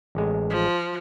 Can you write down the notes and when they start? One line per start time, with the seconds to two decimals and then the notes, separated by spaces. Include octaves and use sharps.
0.15 A1 G#3
0.50 F3